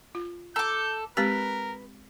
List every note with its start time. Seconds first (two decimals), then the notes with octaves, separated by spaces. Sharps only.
0.15 F4
0.56 A4 A#5 D6 G6
1.17 G#3 C4 G4 A#4 B4